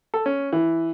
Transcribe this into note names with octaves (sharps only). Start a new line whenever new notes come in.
A4
C#4
E3